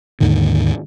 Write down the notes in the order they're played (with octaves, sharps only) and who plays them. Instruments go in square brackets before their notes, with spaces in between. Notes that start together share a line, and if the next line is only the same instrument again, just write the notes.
[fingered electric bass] D#2 G#2 D3 D#3